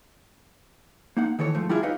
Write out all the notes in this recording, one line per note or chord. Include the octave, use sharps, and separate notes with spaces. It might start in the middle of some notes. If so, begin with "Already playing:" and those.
A#3 D#4 F#5
D#3 E3 A4 C#5
G#2 F3 A3
G3 E4 F4 G#4 E5
D#4 G4 B4 C#5 D#5 F5